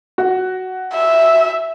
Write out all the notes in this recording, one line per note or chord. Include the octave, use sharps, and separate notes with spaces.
F#4
E5